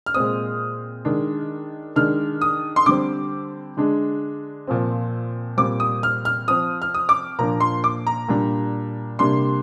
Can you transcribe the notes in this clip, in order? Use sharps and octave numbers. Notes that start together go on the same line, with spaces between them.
F6
A#2 G#3 C4 D#6
D#3 G#3 D4
D#3 G#3 D4 F6
D#6
C6
D3 G3 C4 D6
D3 G#3 D4
A#2 F3 C4
A#2 G3 C4 D6
D#6
F6
F6
F3 C4 D#6
F6
D#6
D6
A#2 F3 A#3 D4 A#5
C6
D6
A#5
A#2 G3 D4
C3 G3 A#3 D4 C6